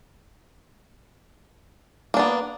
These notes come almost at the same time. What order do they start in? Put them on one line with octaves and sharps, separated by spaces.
A#3 D4 B3